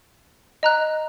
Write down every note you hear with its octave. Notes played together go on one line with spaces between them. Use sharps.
D#5 A#5 F#6